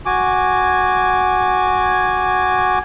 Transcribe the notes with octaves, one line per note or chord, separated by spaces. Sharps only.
F#4 G#5 D6